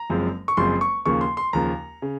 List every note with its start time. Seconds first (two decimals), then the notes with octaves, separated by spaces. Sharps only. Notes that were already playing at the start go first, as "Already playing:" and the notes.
Already playing: A#5
0.10 F#1 F#2 F3 G#3 C4
0.48 C#6
0.57 F#1 F#2 F3 G#3 C4 C6
0.81 C#6
1.05 D#2 C#3 F3 A#3 C#6
1.21 C6
1.37 C6
1.53 D#2 C#3 F3 A#3 A#5
2.02 C#3